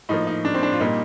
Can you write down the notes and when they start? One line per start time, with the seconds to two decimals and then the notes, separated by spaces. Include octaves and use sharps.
0.09 A2 F3 A#3 D#4
0.27 D#4
0.45 D4
0.54 C4
0.63 D4
0.72 F4
0.80 A#2 G3 A#3 D#4